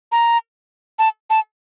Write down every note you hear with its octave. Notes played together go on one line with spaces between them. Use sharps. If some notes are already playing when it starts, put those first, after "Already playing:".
A#5
A5
A5